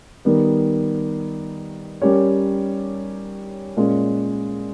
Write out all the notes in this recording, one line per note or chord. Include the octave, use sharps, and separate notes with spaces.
D#3 G3 B3
G3 C#4 G4 A#4 C#5
A#2 G#3 C#4